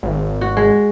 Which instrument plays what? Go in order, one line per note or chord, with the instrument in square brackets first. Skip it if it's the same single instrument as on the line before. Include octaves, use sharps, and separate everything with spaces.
[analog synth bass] G#1
[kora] F#4
G#3